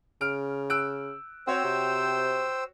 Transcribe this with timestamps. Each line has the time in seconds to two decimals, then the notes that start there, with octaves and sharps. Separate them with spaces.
0.21 C#3 F6 D7
0.70 E6 F#6 D7
1.47 C4 F#4 C5 C#5 G5 E6
1.64 C3